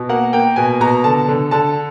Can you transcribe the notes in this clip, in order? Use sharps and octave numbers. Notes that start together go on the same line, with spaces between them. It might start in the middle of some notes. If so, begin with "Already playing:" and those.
Already playing: B2
A#3 F#5
A#3 G5
B2 G#5
B2 A#5
D3 A5
D3
D3 A5